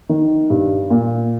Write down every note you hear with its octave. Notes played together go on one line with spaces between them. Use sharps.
D#3
G2
A#2